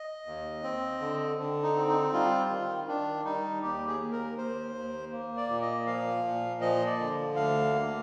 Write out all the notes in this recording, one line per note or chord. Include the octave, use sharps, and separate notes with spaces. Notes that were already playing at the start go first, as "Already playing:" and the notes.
Already playing: D#5
D#2
C4
D3
D3
D#4
C4
D#4
G3 F4
D#3
D#3 D4
G3 D#4
D#2 G4
G#4
D#2
A#4
D#2 C5
D#2
A#3
D5
A#2
D#5
F3 F5
A#2
F3 D#5
D5
D3
D2 F5
A#3